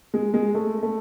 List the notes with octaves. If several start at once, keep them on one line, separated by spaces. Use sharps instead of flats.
G#3
G#3
A3
A3